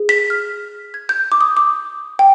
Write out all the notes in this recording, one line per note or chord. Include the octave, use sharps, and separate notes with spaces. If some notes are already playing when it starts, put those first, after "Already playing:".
Already playing: G#4
B6
F6
G#6
G6
D6
D#6
D6
G5